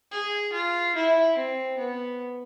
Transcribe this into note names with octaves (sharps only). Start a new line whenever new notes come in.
G#4
F4
E4
C4
B3